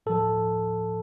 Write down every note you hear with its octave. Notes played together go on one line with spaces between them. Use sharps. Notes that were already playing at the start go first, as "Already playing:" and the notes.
A2 F3 A4